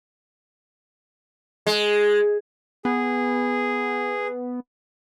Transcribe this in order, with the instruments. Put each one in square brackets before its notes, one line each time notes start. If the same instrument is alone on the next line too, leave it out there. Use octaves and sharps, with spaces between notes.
[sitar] G#3
[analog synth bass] B3 [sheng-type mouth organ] G#4